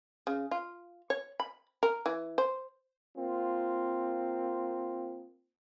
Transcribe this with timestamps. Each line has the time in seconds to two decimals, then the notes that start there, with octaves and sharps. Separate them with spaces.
0.27 C#3
0.51 F4
1.10 C#5
1.40 B5
1.83 A#4
2.06 E3
2.38 C5
3.16 A#3 C4 F4